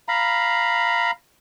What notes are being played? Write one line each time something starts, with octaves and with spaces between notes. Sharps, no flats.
F5 A#5 B5